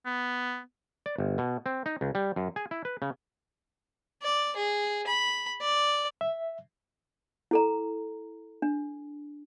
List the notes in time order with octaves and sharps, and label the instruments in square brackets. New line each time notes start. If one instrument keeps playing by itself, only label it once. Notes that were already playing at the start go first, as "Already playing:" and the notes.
[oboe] B3
[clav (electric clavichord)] D5
G1
B2
C4
D#4
C#2
G3
F#2
G#4
E4
B4
C#3
[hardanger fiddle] D5
G#4
B5
D5
[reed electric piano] E5
[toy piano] E4 A4 A#5
D4